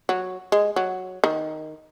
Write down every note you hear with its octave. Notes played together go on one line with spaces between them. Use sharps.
F#3
G#3
F#3
D#3